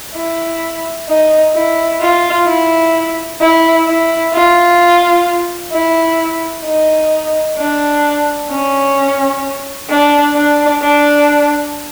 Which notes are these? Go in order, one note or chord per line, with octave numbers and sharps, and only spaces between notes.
E4
D#4
E4
F4
E4
E4
E4
F4
E4
D#4
D4
C#4
D4
D4
D4